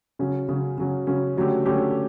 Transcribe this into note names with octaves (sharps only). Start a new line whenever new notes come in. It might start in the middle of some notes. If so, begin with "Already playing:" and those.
C#3 F#3 C#4
C#3 F#3 C#4
C#3 F#3 C#4
C#3 F#3 C#4
D3 F#3 A3 C#4 G4
D3 F#3 A3 C#4 G4